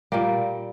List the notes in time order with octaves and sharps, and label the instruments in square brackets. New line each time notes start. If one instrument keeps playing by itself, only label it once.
[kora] A#2 G3 A#3